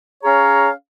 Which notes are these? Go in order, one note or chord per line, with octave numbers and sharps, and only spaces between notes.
C#4 G#4 C#5 F5 A#5